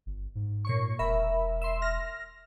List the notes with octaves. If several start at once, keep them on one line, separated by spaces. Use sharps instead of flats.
G1
G#2
A#2 C#5 C#6
E1 A#4 E5 B5
E5 C6
F6 A#6